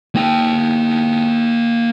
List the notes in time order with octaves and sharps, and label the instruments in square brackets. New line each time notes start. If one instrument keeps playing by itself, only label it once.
[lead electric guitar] A#3 G5